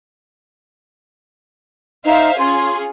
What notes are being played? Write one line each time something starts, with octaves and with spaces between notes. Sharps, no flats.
D#4 C5 E5 F5
C#4 F4 G#4 C6